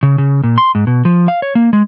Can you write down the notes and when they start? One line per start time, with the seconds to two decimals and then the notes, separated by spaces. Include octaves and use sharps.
0.03 C#3
0.18 C#3
0.44 A#2
0.58 C6
0.75 G#2
0.87 B2
1.05 F3
1.28 F5
1.42 C#5
1.55 A#3
1.73 G#3